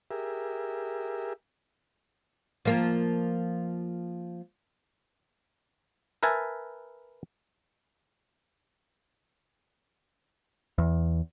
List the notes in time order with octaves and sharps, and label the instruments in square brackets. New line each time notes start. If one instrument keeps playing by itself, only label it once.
[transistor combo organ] G4 G#4 A#4 E5
[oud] F3 A#3
[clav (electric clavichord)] A#4 B4 E5 G#5 A5
[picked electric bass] E2